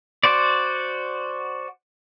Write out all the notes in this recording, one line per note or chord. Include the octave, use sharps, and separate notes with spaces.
F#4 C5 D5